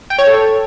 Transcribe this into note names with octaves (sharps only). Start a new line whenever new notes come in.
G5
C#5
A4